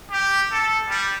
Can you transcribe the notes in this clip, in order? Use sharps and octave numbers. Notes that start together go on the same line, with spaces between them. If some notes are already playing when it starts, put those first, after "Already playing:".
G4
A4
G3